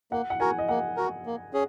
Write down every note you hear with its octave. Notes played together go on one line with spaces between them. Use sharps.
A#3 F#5
F#5
F#4 A#4 G#5
D#5
A#3 F#5
F#4 A#4
A#3
C#4 G#4